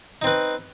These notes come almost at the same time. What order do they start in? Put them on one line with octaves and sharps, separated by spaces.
D#4 C4 B4